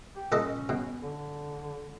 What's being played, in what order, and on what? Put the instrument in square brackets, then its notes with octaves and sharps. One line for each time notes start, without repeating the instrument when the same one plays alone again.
[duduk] G4
[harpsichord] A#2 A4 D#5 [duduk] C#4
[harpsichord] B2
[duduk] D3